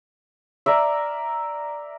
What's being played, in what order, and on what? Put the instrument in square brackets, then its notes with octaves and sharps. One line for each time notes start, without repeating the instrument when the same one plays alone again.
[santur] A#4 D5 E5